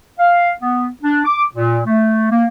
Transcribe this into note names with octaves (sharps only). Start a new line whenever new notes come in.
F5
B3
D4
D6
A#2
A3
A#3